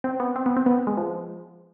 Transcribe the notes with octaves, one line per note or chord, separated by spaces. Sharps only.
C4
B3
C4
B3
C4
B3
G#3
F3